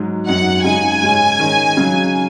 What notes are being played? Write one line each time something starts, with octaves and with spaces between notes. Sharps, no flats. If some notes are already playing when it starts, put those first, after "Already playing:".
Already playing: G#2 F#3 D#4
F#2 F#3 D#4 F#5
C#3 G#3 D#4 G#5
G#2 G#3 C#4
D#3 G#3 C#4
C#3 F#3 C#4